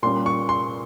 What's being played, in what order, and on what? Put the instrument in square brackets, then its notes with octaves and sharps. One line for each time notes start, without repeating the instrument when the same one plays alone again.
[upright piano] A#2 G3 A#3 C#4 C6
C#6
C6